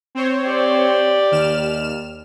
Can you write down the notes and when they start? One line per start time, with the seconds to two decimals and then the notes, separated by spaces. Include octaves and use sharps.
0.15 C4 C5 C#5
0.45 G4 D5
1.32 D#2 F6 E7